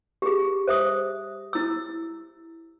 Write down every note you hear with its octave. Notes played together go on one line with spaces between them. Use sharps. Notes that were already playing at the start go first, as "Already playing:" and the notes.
G4 G#4
C5 E5 D#6
E4 E6